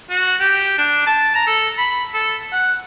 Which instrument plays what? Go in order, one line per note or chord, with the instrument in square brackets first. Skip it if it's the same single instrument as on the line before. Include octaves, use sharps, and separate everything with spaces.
[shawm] F#4
G4
D4
A5
A#5
A4
B5
A4
F#5